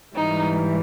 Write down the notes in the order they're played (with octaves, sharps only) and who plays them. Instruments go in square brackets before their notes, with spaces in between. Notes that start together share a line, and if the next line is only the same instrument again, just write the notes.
[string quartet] G#2 E3 G3 D#4